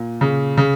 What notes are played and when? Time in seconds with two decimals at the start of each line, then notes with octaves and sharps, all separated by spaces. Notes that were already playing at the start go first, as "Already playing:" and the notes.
Already playing: A#2
0.21 C#3
0.57 C#3